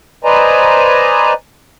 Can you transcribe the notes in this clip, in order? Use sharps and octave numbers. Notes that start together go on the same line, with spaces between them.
B4 C5 D5 D#5 G#5 A#5